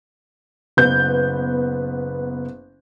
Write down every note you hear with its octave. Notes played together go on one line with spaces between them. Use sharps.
F#1 B3 G6